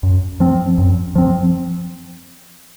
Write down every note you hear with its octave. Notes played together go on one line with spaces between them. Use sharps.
F#2
F3 C4
F#2
F3 C4